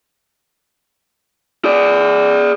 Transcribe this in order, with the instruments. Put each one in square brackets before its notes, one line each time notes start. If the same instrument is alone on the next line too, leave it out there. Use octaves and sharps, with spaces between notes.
[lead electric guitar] G#4 D5